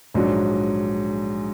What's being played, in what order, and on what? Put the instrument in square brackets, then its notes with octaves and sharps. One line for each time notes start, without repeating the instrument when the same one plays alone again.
[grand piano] A#1 G#2 F#3 D4